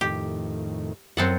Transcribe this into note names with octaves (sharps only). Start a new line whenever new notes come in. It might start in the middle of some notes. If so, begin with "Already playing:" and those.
F2 A2 D#3 G4
F#2 C4 A4 F#5